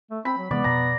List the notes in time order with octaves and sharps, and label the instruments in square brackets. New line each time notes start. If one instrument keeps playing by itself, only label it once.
[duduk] A3
[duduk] C4 [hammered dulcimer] B5
[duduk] F#3
[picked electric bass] C3 E3 G#3 [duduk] B3 [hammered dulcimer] D5
[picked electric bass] F2 B2 [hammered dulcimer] A#5